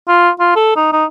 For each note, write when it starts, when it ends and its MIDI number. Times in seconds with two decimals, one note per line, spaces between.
0.08 0.30 65
0.40 0.55 65
0.56 0.74 69
0.76 0.92 63
0.92 1.05 63